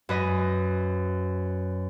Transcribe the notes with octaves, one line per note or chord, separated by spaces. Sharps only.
F#2 B4 D#5